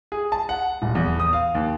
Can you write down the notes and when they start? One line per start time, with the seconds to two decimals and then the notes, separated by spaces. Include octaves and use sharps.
0.12 G#4
0.32 A5
0.49 F#5
0.82 D#1
0.95 E2
1.20 D#6
1.33 F5
1.55 D#2